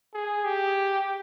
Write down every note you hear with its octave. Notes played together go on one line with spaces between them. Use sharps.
G#4
G4